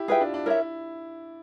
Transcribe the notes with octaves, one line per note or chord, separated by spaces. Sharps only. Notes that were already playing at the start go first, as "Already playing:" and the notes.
Already playing: E4 G4
F4 G#4 B4 E5 G5
D4
D4
E4 A#4 C#5 E5